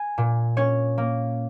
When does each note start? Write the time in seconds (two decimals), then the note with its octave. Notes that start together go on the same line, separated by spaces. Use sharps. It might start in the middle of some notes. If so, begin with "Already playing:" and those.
Already playing: G#5
0.18 A#2
0.57 C#4 C#5
0.98 A#3